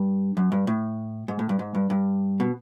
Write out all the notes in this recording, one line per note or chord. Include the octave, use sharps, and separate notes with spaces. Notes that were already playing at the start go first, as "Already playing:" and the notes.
Already playing: G2
F#2
G2
A2
G#2
A2
G2
G#2
G2
G2
B2